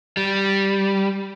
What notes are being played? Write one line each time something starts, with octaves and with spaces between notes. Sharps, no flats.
G3